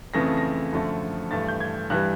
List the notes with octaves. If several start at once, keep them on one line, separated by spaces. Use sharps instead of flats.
F2 C#3 E3 A3 A#6
A#6
F#2 D3 F3 A3
G2 E3 A3 A6
G6
G#6
G2 E3 G3 F#6